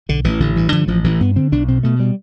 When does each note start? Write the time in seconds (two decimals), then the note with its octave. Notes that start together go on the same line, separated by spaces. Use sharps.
0.09 B1 D3
0.24 A1 E3
0.40 A1 D3
0.56 G2 E3
0.72 D3 F3
0.88 A1 F3
1.04 A1 E3
1.20 G2 B3
1.36 D3 C4
1.52 B1 D4
1.68 B2 C4
1.83 B2 A3
2.00 G3